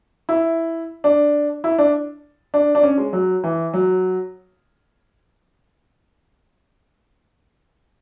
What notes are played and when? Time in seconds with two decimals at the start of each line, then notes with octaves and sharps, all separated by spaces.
0.29 E4
1.04 D4
1.64 E4
1.78 D4
2.54 D4
2.75 D4
2.83 C#4
2.98 G#3
3.13 F#3
3.44 E3
3.74 F#3